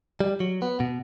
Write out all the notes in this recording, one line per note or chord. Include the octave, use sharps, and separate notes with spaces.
G3
F#3
B3
B2